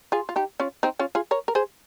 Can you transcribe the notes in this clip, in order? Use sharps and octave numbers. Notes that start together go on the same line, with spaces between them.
F4 G#4
F4
D#4 G4
C#4 F4
C4 D#4
C#4 F4
F4 G#4
A#4 C#5
A#4
G#4 C5